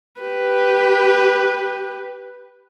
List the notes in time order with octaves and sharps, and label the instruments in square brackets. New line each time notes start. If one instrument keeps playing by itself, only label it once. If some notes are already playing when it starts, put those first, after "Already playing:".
[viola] G4 B4